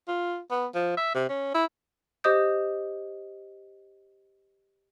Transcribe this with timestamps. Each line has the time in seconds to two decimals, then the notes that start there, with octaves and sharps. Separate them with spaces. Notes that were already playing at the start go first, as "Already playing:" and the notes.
0.08 F4
0.51 B3
0.74 F3
0.97 E5
1.15 C3
1.29 C#4
1.54 E4
2.24 G4 C5 D#5 D#6 G6